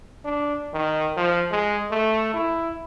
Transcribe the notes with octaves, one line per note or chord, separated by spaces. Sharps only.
D4
D#3
F3
G#3
A3
E4